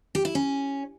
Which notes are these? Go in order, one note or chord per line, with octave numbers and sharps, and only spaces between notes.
G4
E4
C#4